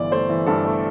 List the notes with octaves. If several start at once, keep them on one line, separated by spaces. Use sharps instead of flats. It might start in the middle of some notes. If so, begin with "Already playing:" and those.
Already playing: G1 E3 D5
A3 C5
E3
G2 A4
A3